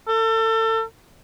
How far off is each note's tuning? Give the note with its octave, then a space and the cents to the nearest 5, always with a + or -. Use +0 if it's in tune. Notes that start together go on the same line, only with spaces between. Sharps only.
A4 +30